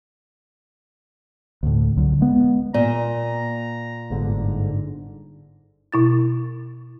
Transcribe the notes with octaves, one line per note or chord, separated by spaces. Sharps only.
D2 A2
C#2 D3 F#3
G#3 B3
A#2 D5 A#5
G1 G#2 D3
B2 E4 A6